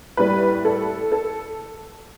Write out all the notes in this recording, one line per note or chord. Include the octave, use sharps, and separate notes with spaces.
A2 G3 B4
A4
A4